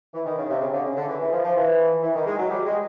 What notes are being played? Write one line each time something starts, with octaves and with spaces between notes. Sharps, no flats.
E3
D#3
C#3
C3
C#3
D3
C#3
D3
E3
E3
F3
F3
E3
E3
D#3
G#3
F#3
G3
G#3